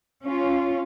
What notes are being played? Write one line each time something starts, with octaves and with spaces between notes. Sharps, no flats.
C#4 F4